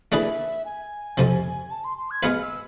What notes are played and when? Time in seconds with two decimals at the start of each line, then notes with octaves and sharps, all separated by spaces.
0.12 E3 A3 D4 G#4 B4 E5
0.65 G#5
1.17 F2 C3 F3
1.70 A5
1.84 C6
1.97 C6
2.10 G#6
2.23 G#3 B3 F4 B4 F6
2.41 E6